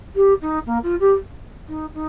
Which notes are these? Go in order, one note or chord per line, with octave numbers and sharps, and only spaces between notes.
G4
D#4
A#3
F4
G4
D#4
D#4